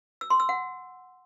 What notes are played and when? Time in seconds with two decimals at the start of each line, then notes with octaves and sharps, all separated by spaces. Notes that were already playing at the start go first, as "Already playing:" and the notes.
0.21 E6
0.30 C6
0.40 E6
0.49 F#5